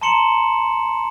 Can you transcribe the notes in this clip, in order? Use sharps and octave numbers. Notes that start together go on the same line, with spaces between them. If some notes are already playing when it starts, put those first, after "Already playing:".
A5 A#5 C6 C#7 E7 F#7